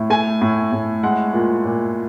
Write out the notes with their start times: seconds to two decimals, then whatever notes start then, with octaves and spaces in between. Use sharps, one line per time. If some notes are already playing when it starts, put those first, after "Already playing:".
Already playing: A2
0.10 A3 G#5
0.41 A2
0.72 A2
1.03 G#3 F#5
1.33 A#2
1.65 A#2